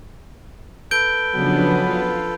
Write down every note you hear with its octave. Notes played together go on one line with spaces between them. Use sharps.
A4 B4 G6 D7 G7
C#3 F3 F#3 G#3 B3 D4
F4